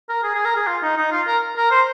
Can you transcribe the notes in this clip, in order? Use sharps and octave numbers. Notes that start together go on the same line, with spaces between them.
A#4
G#4
G#4
A#4
G#4
F4
D#4
D#4
F4
A#4
A#4
C5